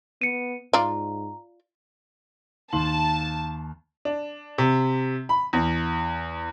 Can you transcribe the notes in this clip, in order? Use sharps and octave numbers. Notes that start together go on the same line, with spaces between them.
B3 C#7 D#7
G#2 F4 D5 A#5
D#2 A5 C6 F#7
D4
C3
B5
E2